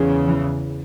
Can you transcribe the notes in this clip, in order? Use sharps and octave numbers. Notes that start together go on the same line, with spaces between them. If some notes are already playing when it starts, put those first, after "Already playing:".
Already playing: E2 C#3
E3